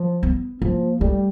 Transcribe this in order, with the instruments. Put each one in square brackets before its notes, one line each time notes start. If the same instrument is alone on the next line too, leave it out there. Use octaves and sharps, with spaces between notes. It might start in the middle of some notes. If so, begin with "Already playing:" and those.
Already playing: [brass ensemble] F3
[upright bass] B3
[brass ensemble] F3 [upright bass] A#3
[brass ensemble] G3 [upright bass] A3